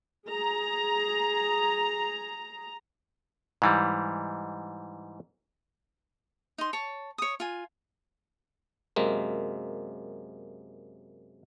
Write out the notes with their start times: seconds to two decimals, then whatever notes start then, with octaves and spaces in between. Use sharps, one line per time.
0.28 G#4 A#5
3.62 G#2 E3 G3
6.58 D#4 C6
6.73 C#5 A5
7.18 C#5 D#6
7.40 F4 G#5
8.96 F#2 C3 G#3 A#3